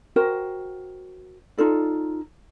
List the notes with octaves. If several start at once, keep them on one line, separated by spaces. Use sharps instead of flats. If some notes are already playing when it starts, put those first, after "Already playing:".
F#4 A#4 C5 G5
D#4 F4 A4 D5